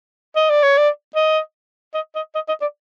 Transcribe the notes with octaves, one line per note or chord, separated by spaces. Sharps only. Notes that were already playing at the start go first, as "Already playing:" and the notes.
D#5
D5
C#5
D5
D#5
D#5
D#5
D#5
D#5
D5